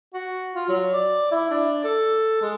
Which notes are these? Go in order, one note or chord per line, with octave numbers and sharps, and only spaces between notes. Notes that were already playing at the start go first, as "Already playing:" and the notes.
F#4
F4
F#3
D5
E4
D4
A4
G#3